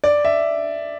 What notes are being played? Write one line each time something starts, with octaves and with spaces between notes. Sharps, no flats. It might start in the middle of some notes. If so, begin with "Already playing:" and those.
D5
E5